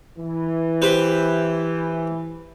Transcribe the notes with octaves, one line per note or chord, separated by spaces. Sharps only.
E3
G4 B4 C5